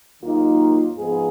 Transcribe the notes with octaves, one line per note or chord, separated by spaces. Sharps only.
D#2 D#3 F#3 A#3 D#4 F4
G#2 F3 B3 D#4 G#4